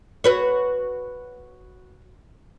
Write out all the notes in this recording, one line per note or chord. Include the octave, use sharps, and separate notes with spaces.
F#4 B4 C#5